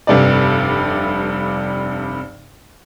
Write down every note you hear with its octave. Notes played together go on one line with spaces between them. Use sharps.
F1 G2 C3 B4 D5